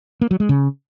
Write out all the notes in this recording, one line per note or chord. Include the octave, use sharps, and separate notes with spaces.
A#3
F#3
G#3
C#3